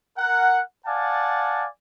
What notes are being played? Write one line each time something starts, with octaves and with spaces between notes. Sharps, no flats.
A#4 F#5
D5 F5 F#5 G#5 A5